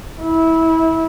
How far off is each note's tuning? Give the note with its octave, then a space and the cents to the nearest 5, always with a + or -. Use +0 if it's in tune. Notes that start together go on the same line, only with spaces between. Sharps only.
E4 -20